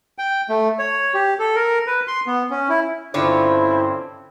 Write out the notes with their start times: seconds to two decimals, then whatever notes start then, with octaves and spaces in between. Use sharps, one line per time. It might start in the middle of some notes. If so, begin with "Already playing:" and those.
0.18 G5
0.49 A3
0.79 C#5
1.14 G4
1.39 A4
1.56 A#4
1.87 B4
2.08 C6
2.27 B3
2.50 C#4
2.69 E4
3.14 G2 D3 C4 C#4 E4 F4 C5 C#5